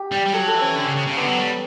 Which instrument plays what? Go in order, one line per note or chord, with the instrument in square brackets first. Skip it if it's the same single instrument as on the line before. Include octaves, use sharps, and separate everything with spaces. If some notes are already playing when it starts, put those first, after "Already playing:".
Already playing: [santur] G4
[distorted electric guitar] G3
G3
[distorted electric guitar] F#3 [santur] A4
[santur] A4
[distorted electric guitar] E3
[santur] C#4
[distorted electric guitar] D3
C#3
C#3
C#3
[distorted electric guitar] D3 [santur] B3
[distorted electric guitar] F#3
G3